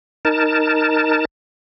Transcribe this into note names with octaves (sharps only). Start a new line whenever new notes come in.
D#4 A#4 A5